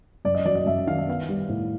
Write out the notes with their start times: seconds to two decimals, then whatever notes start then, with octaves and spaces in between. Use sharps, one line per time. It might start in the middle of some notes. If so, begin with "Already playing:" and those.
0.25 F#2 D5
0.35 D#5
0.45 F#3 D5
0.55 D#5
0.66 F#2 E5
0.87 D#3 F5
0.98 E5
1.08 B3 F5
1.29 G3
1.49 A2